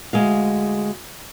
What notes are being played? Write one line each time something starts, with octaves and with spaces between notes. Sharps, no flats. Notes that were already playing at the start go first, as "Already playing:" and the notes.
D2 E3 G#3 G#4 F5